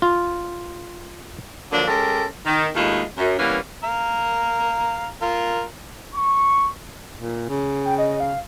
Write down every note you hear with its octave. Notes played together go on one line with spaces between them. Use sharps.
F4
D3 F3 F#3 A#3 D4
G#3 C#4 G4 A4 A#4
D#3
D#2 G#3 A3 E4 F4
F#2
E3 G3 A#3 B3 C#4
F5 A#5
F4 A#4
C#6
A#2
C#3
G5
D#5
F5